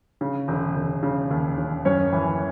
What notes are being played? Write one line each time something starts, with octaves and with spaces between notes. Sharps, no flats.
C#3
E1
E1
C#3
D#2
C#3
F#2 C#4 C#5
E3